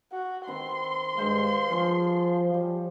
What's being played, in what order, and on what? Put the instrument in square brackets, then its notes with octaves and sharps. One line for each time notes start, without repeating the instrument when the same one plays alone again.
[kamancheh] F#4
[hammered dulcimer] D#3 C4 B5 [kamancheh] C6
[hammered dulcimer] G2 C5 F5 [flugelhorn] G#3
[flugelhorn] F3 [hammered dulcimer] F4 G#4 C#5
[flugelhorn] F3 [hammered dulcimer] G3